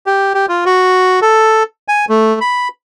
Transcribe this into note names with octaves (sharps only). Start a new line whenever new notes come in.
G4
G4
F4
F#4
A4
G#5
A3
B5